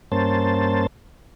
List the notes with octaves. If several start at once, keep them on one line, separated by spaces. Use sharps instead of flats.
G2 A#3 C#4 C5 A5